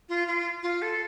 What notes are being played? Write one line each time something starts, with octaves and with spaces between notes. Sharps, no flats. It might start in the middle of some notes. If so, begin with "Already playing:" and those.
F4
F4
F4
A4